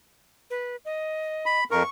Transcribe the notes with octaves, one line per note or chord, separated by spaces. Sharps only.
B4
D#5
B5
F2 A#4 C#6